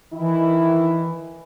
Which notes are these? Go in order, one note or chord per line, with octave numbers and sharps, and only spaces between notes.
D#3 E3 E4